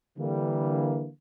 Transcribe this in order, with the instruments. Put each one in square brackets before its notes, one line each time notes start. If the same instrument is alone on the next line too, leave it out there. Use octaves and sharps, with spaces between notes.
[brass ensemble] D3 E3 G3 A#3